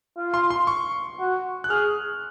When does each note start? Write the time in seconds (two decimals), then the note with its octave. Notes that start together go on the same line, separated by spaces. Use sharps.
0.17 F4
0.34 C6
0.51 C6
0.67 C#6
1.19 F#4
1.64 F#6
1.70 G#4 F6